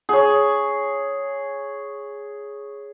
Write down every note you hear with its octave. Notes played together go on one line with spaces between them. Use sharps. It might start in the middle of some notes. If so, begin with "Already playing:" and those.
G#4 C#5